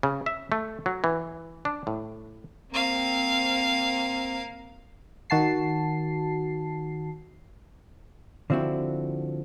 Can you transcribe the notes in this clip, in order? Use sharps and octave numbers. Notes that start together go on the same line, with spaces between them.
C#3
E5
A3
F#3
E3
D4
A2
A#3 C4 F5
D#3 F#4 A5 C7
D3 F3 C4 E4 F#4